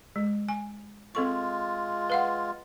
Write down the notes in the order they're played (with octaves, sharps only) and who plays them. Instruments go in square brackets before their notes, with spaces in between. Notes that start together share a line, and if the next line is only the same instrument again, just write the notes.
[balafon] G#3
G#5
[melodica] G#3 F4 [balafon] C4 A4 C#6
[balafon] B4 F5 F#5